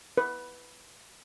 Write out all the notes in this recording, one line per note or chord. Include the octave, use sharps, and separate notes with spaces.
B4